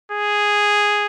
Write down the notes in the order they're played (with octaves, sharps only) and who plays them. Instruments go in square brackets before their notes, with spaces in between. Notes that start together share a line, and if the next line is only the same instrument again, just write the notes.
[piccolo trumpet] G#4